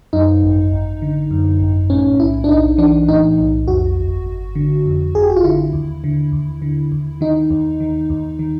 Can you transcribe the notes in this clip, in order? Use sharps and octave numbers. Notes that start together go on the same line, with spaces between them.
F#2 D#4
G#1
G#1
D3
F#2
G#1
A2 C#4
B1 E4
D4
B1 D#4
E3 D4
A2 D#4
B1
F2 F#4
G1
G1
D3
F2
G1 G#4
G4
F#4
F4
D3 E4
D#2
D3
D#2
D3
D#2
D#3 D#4
D#2
D#3
D#2
D#3